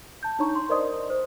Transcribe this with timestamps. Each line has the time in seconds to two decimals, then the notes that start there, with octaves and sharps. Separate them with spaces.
0.23 A5 G6
0.39 D4 D#4 C#5 A#5 C#6
0.55 C6
0.69 A#4 C5 D5 D#5 C6 D#6
1.10 C5